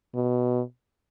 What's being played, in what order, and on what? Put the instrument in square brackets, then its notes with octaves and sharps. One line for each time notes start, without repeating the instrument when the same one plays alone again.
[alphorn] B2